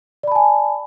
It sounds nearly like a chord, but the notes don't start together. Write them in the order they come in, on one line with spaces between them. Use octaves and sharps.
D5 B5 A5 G#5